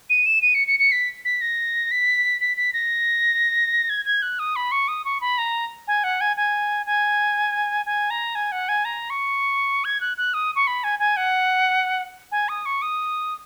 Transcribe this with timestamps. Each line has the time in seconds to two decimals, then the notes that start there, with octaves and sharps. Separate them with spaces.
0.10 D#7
0.26 E7
0.42 D#7
0.54 C#7
0.68 C#7
0.79 C#7
0.92 B6
1.25 B6
1.41 A#6
1.91 B6
2.41 B6
2.57 B6
2.73 A#6
3.90 G#6
4.05 G#6
4.22 F#6
4.39 D#6
4.56 B5
4.72 C#6
4.88 D#6
5.05 C#6
5.21 B5
5.38 A#5
5.88 G#5
6.04 F#5
6.21 G#5
6.37 G#5
6.86 G#5
7.86 G#5
8.10 A#5
8.35 G#5
8.52 F#5
8.69 G#5
8.85 A#5
9.10 C#6
9.85 G#6
10.01 F#6
10.17 F#6
10.34 D#6
10.56 C#6
10.67 B5
10.84 G#5
10.99 G#5
11.17 F#5
12.32 G#5
12.49 D#6
12.66 C#6
12.82 D#6